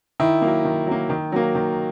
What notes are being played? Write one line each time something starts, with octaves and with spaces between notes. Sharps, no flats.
D#3 E4
F#3 A#3
D#3
F#3 A#3
D#3
F#3 A#3
D#3